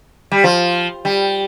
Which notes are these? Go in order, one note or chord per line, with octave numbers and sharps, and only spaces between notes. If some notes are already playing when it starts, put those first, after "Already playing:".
G3
F3
G3